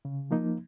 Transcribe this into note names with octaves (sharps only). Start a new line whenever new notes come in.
C#3
F3 A#3 D#4